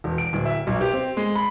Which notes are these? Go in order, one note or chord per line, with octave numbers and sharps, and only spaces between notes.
E1
D7
D1
E5
B1
G4
C4
G#3
B5